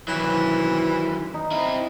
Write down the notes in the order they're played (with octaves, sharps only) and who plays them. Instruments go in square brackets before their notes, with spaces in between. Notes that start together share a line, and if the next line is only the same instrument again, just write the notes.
[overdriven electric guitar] D#3 F#3 [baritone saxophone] E3
[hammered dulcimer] D#4
[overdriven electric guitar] C4 E4